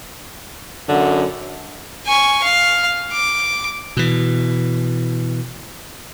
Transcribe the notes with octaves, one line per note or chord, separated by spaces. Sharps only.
F#2 D3
G#5 C#6
F5
D6
B2 E3